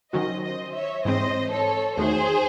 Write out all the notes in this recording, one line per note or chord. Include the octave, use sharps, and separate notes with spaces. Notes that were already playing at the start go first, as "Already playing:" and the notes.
D#3 F#3 C#4 F#4 C5 D#5
C5 D#5
C#5 E5
G#2 E3 G#3 C4 C5 D#5
A4 C#5
E2 D#3 A3 D#4 F#4 G#4 C5